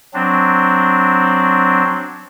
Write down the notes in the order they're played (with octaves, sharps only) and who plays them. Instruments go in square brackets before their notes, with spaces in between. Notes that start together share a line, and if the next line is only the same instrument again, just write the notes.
[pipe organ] F#3 C4 D4